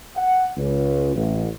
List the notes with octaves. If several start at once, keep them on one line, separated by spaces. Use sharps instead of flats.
F#5
C#2
A1